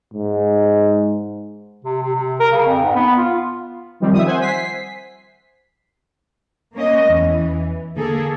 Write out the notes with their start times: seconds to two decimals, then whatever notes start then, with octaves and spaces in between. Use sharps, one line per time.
0.14 G#2
1.85 C3
2.03 C3
2.16 C3
2.40 A#4
2.52 C#3
2.67 F2
2.83 G#2
2.96 B3
3.18 F4
4.00 D#3 F3 G3 C4
4.13 E5 D#6
4.26 C5 F#5 G#5
4.41 B6 C7
6.74 A#3 C#4 D#5
7.09 E2 E3
7.97 D3 A#3 G#4 A4